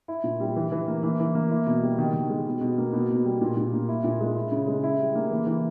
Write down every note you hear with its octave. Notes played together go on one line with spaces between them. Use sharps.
E4
A#2
G3
E3
E3
A#3
E3
E3
A#3
E4
B2
G3
D#3
D#3
G#3
B2
B2
A#3
B2
B2
G3
A#2
A#2
A#3
E4
A#2
G#3
E4
C#3
G#3
E4
G3
A#3
E3
E3